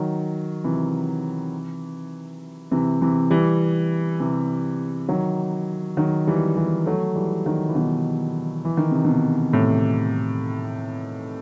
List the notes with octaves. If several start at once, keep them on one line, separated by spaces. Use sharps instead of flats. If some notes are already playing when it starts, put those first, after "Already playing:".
Already playing: D#3 F#3
C3 E3
C3 E3
C3 E3
E3 G3
C3 E3
D#3 F#3
D#3 F#3
E3 G3
E3 G3
F#3 A3
E3 G3
D#3 F#3
E3
B2 D#3
E3
D#3
C3
B2 D#3
A2 C3